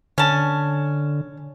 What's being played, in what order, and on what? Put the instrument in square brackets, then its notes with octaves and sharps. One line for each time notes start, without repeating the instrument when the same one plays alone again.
[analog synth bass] D3 [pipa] C#4 A5